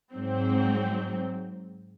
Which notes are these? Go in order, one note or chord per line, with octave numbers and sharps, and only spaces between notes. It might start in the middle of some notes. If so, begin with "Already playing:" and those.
G#2 F#3 C4